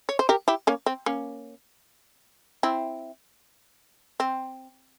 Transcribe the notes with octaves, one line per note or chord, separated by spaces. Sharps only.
C#5
C5
G4 A#4
E4 G4
A#3 C#4
C4
A#3 C#4
C4 E4
C4